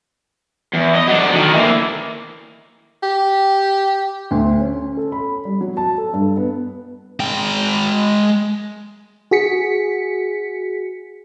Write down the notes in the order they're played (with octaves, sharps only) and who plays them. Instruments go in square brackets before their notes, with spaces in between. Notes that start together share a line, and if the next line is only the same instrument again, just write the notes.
[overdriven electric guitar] E2
D#5
F#3 D4
D3 D#3
E3 A#3
[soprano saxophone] G4
[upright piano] D2
C#4
A4
B5
G3
F#3
A5
A4
G2
B3
[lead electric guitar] G#3 G5
[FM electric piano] F#4 G#4 B6 C#7